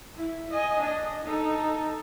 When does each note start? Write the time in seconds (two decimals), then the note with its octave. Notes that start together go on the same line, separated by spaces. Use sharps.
0.16 E4
0.50 D#5 G#5
0.79 D4 D#5
1.24 D#4 A4